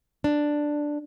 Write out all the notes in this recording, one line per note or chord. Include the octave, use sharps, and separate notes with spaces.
D4